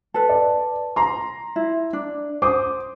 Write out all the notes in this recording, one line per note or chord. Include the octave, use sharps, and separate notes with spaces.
A4 B4
D5
A#5 C6
E4
D4
C5 D6 D#6